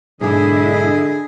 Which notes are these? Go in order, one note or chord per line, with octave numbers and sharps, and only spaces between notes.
B1 G#2 D3 D4 E4 G#4 D#5